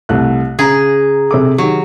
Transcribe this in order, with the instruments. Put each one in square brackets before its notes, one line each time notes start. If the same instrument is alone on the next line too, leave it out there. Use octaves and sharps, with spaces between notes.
[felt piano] C2 A3 F#6
[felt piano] C#3 A#5 [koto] G#4
[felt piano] C3 A4 D6
[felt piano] D#3 G4 [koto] F#3